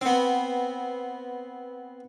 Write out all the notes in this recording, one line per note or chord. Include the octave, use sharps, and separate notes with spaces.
B3 C4